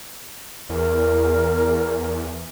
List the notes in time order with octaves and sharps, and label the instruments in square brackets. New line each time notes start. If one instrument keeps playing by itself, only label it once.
[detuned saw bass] E2 [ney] A#4